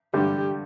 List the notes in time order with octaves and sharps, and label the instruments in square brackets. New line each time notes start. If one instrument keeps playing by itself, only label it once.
[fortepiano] G2 D3 G3 [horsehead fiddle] G4